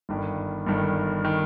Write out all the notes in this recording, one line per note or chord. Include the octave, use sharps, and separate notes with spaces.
G1 G2 D#3
G1 G2 D#3
D#3